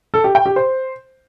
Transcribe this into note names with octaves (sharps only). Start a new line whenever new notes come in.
A4
G4
G5
G4
C5